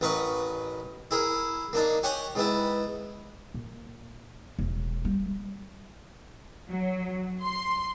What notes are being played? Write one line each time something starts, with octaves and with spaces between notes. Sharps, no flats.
A1 A#4 B4 D#5 C#6
E4 G#4 A#4
A#3 D4 D#4
G4 C#5 F#5 G#5 C#6
G#2 B3 E4
A#2
E1
G3
F#3
C6